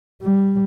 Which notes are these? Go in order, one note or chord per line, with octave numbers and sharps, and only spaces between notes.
G3